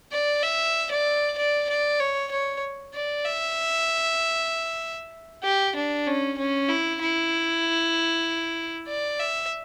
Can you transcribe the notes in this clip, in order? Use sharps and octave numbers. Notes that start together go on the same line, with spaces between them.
D5
E5
D5
D5
D5
C#5
C#5
D5
E5
G4
D4
C#4
C#4
E4
E4
D5
E5